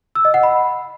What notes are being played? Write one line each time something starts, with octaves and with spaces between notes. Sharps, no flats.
E6
D#5
F#5
B5